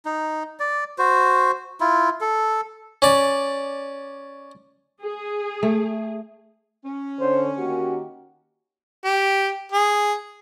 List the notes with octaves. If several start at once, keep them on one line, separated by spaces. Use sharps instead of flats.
D#4
D5
F#4 C5
E4 F4
A4
C#4 D5
G#4
A3
C#4
D3 C5 C#5
D#3 A#3 F#4 G4
G4
G#4